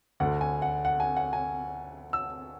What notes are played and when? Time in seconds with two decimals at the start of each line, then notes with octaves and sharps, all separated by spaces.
0.20 D2 D3 F#5
0.41 G#5
0.62 F#5
0.85 F#5
1.00 G#5
1.17 F#5
1.33 G#5
2.13 E6